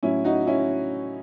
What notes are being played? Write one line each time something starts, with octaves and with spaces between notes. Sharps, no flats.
A2 F#3 C#4 E4
D#4 F#4
C#4 E4